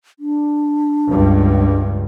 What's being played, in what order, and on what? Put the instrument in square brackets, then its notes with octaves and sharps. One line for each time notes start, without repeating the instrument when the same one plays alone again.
[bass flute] D4
[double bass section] C#2 G2